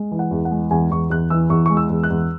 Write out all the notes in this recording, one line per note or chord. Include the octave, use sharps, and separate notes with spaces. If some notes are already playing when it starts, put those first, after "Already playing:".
Already playing: G#3
E3
F#5
E2
F#5
G#3
E2 G#5
E2 C#6
E2 F#6
E3 E6
E2 C#6
G#3 C#6
E6
E2
F#6
E2